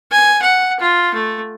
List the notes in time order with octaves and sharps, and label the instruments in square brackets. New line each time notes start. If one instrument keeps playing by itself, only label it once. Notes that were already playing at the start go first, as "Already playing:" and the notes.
[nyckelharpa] G#5
F#5
F4
A3